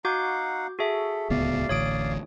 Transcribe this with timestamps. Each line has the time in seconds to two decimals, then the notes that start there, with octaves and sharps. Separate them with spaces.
0.05 D#4 F#4 F5 F#5 D6 G6
0.79 F#4 G#4 A4 E5
1.30 D1 C#2 B3 D5 F5
1.69 D1 A1 D2 C#5 D#6 D7